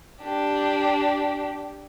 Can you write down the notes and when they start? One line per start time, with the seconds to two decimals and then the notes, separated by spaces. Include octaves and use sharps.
0.23 D4 G4